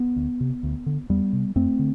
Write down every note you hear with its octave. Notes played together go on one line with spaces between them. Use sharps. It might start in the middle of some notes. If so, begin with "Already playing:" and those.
Already playing: B3
D2
C3
D2
D3
E2 G3 B3
C3
F2 A3 C4
D3